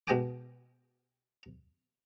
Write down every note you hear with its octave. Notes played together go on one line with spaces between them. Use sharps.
B2 G#3 D#5 G5 G#5 D6